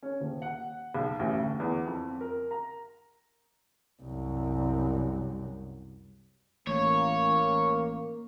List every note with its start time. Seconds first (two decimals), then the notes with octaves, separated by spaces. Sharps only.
0.03 C#4
0.20 D#1
0.42 F#5
0.95 B1
1.19 A1
1.39 D2
1.60 E2
1.86 F2
2.21 A#4
2.51 A#5
4.02 C2 F#2
6.67 A1 A#3 C#5